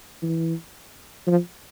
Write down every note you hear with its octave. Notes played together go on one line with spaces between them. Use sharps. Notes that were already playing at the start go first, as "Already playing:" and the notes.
E3
F3